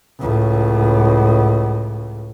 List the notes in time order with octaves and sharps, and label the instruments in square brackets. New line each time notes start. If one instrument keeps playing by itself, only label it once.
[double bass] C#2 A2